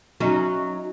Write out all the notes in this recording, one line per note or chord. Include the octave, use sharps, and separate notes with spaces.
F#3 C#4 D#4